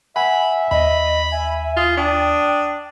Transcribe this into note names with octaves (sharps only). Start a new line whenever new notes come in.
E5 F#5 G#5 B5
D#2 D#5 B5
E5 G#5
F4 D#6
D4 G5 D#6